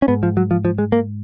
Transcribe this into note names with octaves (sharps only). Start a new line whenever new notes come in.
C#4
G#2 B3
F3
F#3
F3
F3
G#3
A#3